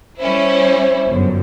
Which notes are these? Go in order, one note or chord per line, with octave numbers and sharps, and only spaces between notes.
G3 C#4 E4 C5
G1 F#2